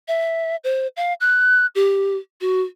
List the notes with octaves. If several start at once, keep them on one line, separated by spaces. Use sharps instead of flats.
E5
C5
F5
F#6
G4
F#4